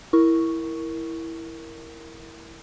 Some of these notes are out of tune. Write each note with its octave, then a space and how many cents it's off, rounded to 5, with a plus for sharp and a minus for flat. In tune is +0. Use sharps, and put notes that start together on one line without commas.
E4 +0 A#4 +0 C#6 +0